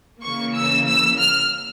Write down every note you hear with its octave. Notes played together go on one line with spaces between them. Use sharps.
C#3 E3 A#3 C#6
E6
E6
F6